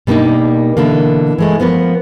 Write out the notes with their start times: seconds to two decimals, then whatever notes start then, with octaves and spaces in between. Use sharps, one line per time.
0.07 B2 G3 A#3 D4 D#4
0.77 B2 D3 E3 A#3
1.39 E3 G#3 A3
1.60 F3 B3 A#4 B4